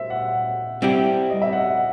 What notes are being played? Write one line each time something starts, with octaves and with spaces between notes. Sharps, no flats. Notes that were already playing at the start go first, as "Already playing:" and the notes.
Already playing: C5 E5
F#5
G3 C4 E4 G4
D#5
E5
F#5